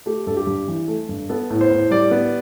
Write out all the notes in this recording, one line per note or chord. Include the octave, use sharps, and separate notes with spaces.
A3 G4
G2 A4
G4
G2
E3
A3
G2
B3 A4
A2
C5
A2
G3 D5
B3